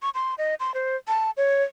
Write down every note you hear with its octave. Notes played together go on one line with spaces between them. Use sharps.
C#6
C6
D#5
C6
C5
A5
C#5